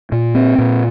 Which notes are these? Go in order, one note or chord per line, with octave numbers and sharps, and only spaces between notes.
A#2
C4
A#2